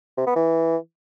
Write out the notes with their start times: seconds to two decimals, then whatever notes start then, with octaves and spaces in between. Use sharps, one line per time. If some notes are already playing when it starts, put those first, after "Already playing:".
0.17 C3
0.27 B3
0.36 E3